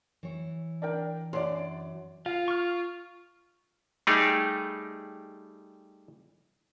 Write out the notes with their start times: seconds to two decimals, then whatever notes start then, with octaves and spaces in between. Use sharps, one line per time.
0.23 E3 C#5
0.82 D4 A#4 G5
1.33 F#2 D4 D5 C6
2.26 F4 F5
2.48 C#6 F6
4.07 G3 A3 D#4 G4 G#4